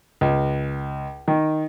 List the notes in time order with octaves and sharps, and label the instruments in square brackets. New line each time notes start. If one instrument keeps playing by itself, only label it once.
[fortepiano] C#2
D#3